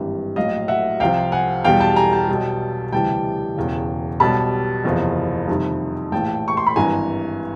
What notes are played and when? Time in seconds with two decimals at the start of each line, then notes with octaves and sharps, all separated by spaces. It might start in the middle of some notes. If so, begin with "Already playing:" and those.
Already playing: G#1 G2 E3 G3
0.36 A#1 A2 F#3 D#5 F5
0.68 E5 F#5
1.00 C2 C3 F3 F5 G5
1.32 F#5 G#5
1.64 E2 B2 G3 F5 G5
1.80 G5 A5
1.96 G#5 A#5
2.13 G5 A5
2.28 B1 B2 G3
2.92 D2 C3 E3 G3 G5 A5
3.56 E1 E2 C#3
4.20 B1 B2 G3 A5 B5
4.84 F#1 E2 C3 F3
5.48 F2 C3 D#3 G3
6.12 A#1 A2 E3 G5 A5
6.48 C#6
6.57 C6
6.67 B5
6.76 G#1 G2 E3 G#5 A#5